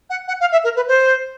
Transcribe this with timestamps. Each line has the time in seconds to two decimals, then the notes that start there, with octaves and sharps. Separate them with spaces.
0.09 F#5
0.27 F#5
0.40 F5
0.51 E5
0.63 A#4
0.75 B4
0.87 C5